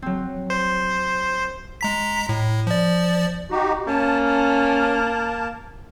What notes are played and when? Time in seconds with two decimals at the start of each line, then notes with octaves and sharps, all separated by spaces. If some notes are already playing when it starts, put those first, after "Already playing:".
0.02 F#3 C4
0.50 C5
1.81 G#3 A#5 B6
2.29 A2
2.67 F3 D5
3.49 D#4 F#4 G4
3.87 A#3 C#4 A5
4.25 A5